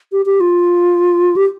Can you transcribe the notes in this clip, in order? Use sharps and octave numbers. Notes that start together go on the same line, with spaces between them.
G4
G4
F4
G4